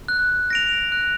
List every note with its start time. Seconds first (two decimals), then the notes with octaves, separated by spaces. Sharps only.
0.08 F#6
0.50 A#6 D7 F7
0.92 F#6